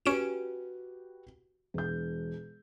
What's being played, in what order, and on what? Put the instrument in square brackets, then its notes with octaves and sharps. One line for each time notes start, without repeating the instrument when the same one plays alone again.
[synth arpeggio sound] C#4 D7 E7 [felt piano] F#4 G4 B4
[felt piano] E1 G6